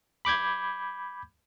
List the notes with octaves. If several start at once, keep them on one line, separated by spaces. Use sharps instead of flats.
B5 D6 G6 G#6